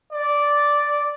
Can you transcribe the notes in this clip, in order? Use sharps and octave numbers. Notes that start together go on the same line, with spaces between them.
D5